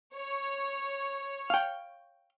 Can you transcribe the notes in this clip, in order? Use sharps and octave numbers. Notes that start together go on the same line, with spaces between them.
C#5
F5 G5